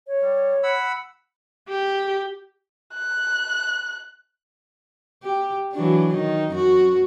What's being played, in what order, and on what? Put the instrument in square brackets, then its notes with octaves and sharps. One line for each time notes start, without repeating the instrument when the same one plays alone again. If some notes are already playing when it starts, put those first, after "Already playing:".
[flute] C#5
[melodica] G3
F#5 B5 E6
[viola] G4
[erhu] F#6
[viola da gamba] G4
E3 F#3 D4
D#3 D#4
F#2 F#4